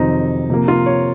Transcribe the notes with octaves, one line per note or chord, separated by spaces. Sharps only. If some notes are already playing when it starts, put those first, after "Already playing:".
Already playing: F2 C3 D#3 F#3 C4 D#4
C3 F3 A#3
F4
C#5